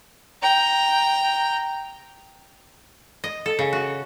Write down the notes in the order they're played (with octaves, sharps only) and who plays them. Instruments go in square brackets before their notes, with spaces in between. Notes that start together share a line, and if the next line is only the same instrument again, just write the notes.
[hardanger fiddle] G5 A#5
[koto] D#5
A4
C#3
F#4